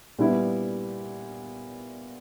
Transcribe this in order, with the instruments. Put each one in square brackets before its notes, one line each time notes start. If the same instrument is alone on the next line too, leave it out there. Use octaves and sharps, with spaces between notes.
[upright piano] A#2 G3 B3 E4